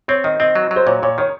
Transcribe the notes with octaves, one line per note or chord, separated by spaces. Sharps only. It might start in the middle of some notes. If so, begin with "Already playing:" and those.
C4 C#5
D#3 D#5
C4 D#5
F#3
F#3
C5
A#2 C#5
A#2 C#5
D#3 C#5